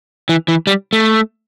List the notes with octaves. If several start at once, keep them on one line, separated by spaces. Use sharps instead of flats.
E3
E3
G3
A3